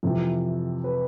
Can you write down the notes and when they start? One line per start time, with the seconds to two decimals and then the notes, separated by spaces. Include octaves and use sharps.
0.03 F2 C3 E3
0.84 B4